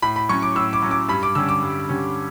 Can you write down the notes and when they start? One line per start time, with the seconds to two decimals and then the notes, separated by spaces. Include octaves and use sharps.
0.02 A2 B5
0.16 B5
0.29 F#3 C#4 C#6
0.42 D6
0.55 A2 E6
0.73 D6
0.82 F#3 C#4
0.91 D6
1.08 G2 B5
1.23 D6
1.35 D3 G3 C#4 E6
1.49 D6
1.62 G2
1.89 D3 G3 C#4